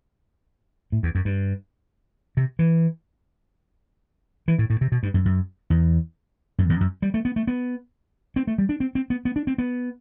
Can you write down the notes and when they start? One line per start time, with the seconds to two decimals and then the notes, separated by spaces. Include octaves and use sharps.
0.92 A2
1.03 E2
1.15 F#2
1.25 G2
2.37 C3
2.59 E3
4.48 E3
4.58 A2
4.70 A2
4.81 C3
4.92 B2
5.03 G2
5.14 F#2
5.25 F#2
5.70 E2
6.58 F#2
6.69 E2
6.81 F#2
7.02 G3
7.14 A3
7.25 B3
7.36 A3
7.47 B3
8.36 C4
8.47 A3
8.58 G3
8.69 D4
8.80 C4
8.95 C4
9.10 B3
9.25 B3
9.36 D4
9.47 C4
9.58 B3